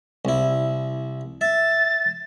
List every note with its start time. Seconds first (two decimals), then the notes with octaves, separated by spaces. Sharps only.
0.25 C2 E4
1.41 E5 A6